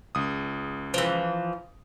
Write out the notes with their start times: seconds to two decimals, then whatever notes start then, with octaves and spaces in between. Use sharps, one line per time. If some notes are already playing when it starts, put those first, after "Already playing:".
0.15 C#2 D#6
0.94 E3 F3